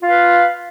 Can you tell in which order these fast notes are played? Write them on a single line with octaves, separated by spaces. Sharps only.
F4 F5 B4